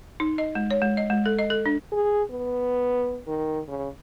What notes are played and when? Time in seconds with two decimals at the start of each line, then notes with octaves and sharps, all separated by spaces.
0.20 D#4
0.38 D#5
0.55 G#3
0.71 C#5
0.82 G#3
0.97 D#5
1.10 G#3
1.26 A4
1.39 D#5
1.50 A4
1.66 D4
1.92 G#4
2.31 B3
3.27 D#3
3.68 C#3